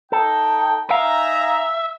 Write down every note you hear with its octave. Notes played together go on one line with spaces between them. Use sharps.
D#4 A4 G5
D#4 E5 F5 G#5 A#5